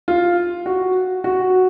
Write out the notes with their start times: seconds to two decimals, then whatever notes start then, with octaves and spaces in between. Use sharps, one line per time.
0.08 F4
0.66 F#4
1.24 F#4